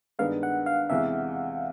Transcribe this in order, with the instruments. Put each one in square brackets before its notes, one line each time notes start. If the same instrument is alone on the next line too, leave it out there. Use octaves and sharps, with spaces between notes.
[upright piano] G2 D#3 G#3 B3 [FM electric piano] F5
[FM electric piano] F#5
F5
[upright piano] E2 C3 E3 G#3 [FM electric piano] E5